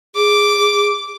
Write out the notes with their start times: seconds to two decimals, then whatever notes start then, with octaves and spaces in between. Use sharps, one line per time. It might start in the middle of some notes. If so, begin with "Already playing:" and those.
0.16 G#4 D6